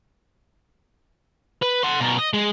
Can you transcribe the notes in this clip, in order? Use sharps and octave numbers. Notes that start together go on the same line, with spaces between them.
B4
F#5 C6
B2 A#4
D#5
G#3